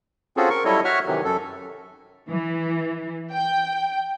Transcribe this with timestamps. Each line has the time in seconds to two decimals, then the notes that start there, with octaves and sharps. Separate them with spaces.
0.37 C4 C#4 F4 F#4 G#4 A4
0.50 A#4 C#6
0.65 F#3 G3 E4 A4 C#5 D#5
0.85 F#4 C#5 E5 F#5 C#6 F6
1.07 C3 D#3 E3 F#3
1.24 F#2 A4
2.28 E3
3.32 G5